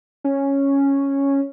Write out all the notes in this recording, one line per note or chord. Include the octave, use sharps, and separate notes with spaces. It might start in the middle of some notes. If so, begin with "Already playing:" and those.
C#4